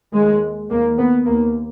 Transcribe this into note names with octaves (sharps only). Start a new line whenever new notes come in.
D#2 G#3
D#2 A#3
B3
D#2 A#3